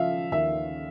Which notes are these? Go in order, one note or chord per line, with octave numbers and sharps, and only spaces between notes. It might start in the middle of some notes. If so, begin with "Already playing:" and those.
Already playing: C#3 F3 E5 F5
D#2 E5